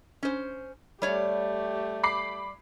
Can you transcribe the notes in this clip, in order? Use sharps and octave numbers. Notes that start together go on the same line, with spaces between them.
C#4 C5
G3 A3 G4 C#5 D5
B5 D6 C7